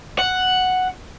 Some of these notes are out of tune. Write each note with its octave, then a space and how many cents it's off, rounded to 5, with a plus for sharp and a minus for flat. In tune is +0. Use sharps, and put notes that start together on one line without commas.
F#5 +0